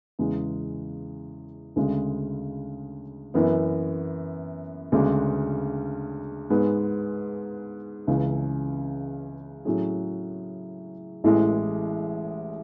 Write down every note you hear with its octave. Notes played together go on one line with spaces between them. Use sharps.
E2 C#3 G#3
D2 C#3 G#3
F#2 E3 B3
D2 C#3 G#3 D4
G#2 G#3 B3
C#2 C#3 E3
A2 F#3 C#4 G#4
A1 A2 E3 G#3